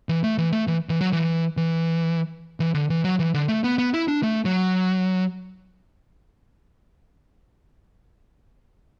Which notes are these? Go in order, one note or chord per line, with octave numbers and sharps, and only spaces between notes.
E3
A3
E3
A3
E3
E3
F#3
E3
E3
E3
D3
E3
F#3
E3
D3
A3
B3
B3
E4
D4
A3
F#3